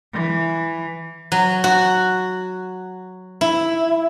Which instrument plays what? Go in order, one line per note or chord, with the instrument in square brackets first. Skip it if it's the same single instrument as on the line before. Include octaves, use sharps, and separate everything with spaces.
[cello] E3
[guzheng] F#3
F#4
E4